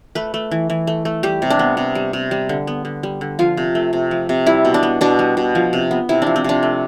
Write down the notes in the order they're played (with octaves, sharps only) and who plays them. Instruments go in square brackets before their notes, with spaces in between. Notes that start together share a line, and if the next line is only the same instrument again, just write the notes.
[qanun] A3 B4
A3
E3
E3
A3
A3
G3 G4
C3
D4
B3
C3
G3
C3
G3
D3
B3
D3
G3
D3
F3 F4
C3
A3
C3
F3
C3
G3 E4
B2
D4
B3
B2 D4
G3
B2
F3
C3
B3
C3 E4
F3 D4
C4
C3 D4
A3